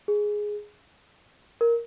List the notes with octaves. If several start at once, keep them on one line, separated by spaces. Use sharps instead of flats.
G#4
A#4